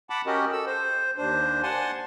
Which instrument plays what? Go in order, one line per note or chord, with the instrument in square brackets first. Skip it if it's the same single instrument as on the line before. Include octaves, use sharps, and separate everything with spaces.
[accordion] F#5 A5 B5 D6
C#4 F#4 G4 A#4 D#5
A4 E6
C5
D#2 D4 C5
F#5 G#5 A5 C6